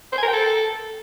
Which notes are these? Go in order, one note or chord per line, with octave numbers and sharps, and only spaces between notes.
C5
G#5
A#4
G5
A4